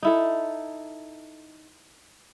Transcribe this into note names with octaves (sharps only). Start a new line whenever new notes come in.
D#4 E4 A4